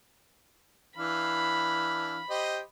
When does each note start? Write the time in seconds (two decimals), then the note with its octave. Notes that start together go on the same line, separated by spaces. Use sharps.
0.98 E3 D4 F5 B5
2.30 G4 C5 D#5